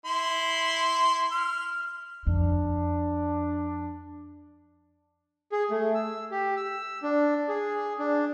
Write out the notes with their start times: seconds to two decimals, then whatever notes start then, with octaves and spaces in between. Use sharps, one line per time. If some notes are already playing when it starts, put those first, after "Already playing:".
0.06 E4 C6
1.32 F6
2.27 F2 D4
5.52 G#4
5.71 A3
5.95 E6
6.31 G4
6.57 E6
7.03 D4
7.49 G#4
7.99 D4